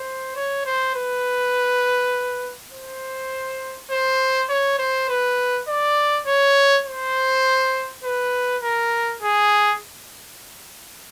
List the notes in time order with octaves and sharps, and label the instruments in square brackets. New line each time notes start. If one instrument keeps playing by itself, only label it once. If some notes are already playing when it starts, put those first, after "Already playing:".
Already playing: [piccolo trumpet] C5
C#5
C5
B4
C5
C5
C#5
C5
B4
D5
C#5
C5
B4
A#4
G#4